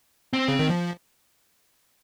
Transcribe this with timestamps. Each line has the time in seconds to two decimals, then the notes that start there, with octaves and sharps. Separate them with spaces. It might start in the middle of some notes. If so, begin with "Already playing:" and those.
0.33 C4
0.48 C#3
0.59 D#3
0.70 F3